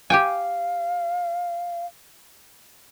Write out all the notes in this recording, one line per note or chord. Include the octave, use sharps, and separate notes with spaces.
G4 F5 G5 G#5